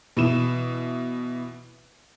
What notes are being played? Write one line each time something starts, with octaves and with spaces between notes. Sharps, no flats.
B2 E3 E7